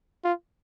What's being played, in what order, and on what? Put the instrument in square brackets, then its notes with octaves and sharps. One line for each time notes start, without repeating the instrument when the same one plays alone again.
[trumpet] F4